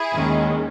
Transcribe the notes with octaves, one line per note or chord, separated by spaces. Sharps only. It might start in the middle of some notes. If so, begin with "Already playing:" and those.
Already playing: E4 G#4
D#2 D#3 G#3 C#4